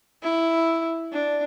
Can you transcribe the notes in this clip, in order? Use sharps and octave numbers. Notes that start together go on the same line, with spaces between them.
E4
D4